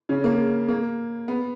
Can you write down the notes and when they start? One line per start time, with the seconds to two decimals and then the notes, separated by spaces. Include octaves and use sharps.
0.09 C#3 C#4
0.24 A#3
0.68 A#3
1.28 B3